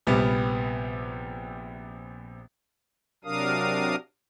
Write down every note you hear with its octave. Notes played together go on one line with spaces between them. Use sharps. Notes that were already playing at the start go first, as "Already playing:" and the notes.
A#1 C3 G3 B3
C3 F#3 D4 A#4 F5 D#6